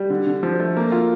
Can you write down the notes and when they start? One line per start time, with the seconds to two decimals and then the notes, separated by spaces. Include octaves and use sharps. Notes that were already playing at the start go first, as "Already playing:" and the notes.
Already playing: G3
0.10 D3
0.27 D3
0.43 F3
0.60 A3
0.77 A#3
0.92 F4